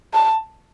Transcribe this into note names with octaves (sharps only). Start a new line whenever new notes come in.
A5